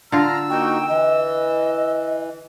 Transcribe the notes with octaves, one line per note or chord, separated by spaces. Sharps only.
D3 F4 A#5 E6 F6
A#3 D#4 F#4 G5
E3 D#5